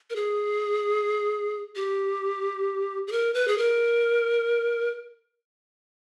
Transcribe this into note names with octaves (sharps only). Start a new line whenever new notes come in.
A#4
G#4
G4
G#4
A#4
B4
G#4
A#4